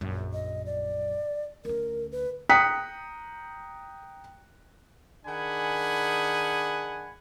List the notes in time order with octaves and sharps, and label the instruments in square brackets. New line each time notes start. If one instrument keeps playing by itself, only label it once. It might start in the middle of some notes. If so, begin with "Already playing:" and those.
[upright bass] A#1 F#2
[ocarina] D#5
D5
[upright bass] D2 C#4 [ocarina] A#4
[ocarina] B4
[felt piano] G5 A#5 D#6 F#6 B6 C#7
[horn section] D#3 D4 G#4 F#5 G#5 B5